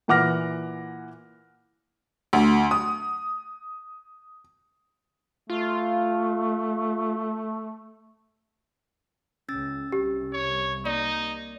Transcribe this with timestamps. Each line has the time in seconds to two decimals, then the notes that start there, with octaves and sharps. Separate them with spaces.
0.08 A#2 E3 F#5 D6 F6 A#6
2.33 D2
2.71 D#6
5.50 A3 F4
9.49 C#2 C#4 E6 A6
9.92 C2 G4
10.33 C#5
10.85 A#3 D#4 D5